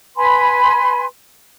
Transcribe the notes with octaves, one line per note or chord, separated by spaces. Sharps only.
B4 G#5 B5 C6